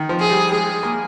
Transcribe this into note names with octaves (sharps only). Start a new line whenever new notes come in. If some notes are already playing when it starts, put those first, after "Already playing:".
Already playing: D#3
F3
G#4
G3
G#3 G#4
A#3